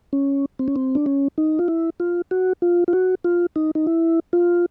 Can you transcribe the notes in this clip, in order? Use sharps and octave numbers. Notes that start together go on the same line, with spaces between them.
C#4
C4
C#4
C4
D4
C#4
D#4
F4
E4
F4
F#4
F4
F4
F#4
F4
D#4
D#4
E4
F4